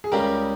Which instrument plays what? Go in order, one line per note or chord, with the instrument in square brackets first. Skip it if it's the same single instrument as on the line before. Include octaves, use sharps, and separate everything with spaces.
[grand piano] G#4
[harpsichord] C#2 C#3 G3 [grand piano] G4 A#4